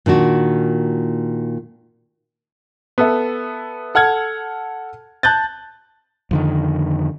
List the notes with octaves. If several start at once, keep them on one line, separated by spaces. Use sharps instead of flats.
A#2 D#3 D4 F#4
B3 A4 E5
A4 F#5 F6 G#6
A5 F#6 G6 A6
F2 D3 D#3